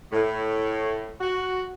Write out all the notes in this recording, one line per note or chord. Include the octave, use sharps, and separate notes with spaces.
A2
F#4